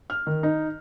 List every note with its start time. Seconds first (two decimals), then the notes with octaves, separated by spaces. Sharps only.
0.10 F6
0.27 D#3
0.43 D#4